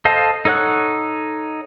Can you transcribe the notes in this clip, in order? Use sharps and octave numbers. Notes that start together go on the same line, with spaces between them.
A4 C5 D#5 F5 A5
D#4 A4 C#5 F#5 F#6